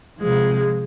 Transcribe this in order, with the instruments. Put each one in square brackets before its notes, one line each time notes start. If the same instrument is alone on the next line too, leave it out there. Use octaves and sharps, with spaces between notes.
[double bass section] C3 F3 [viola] G#3